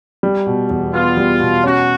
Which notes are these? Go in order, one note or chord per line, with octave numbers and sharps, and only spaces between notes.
G3
B2
E2
B3 F4
G3
B2
C#4 F#4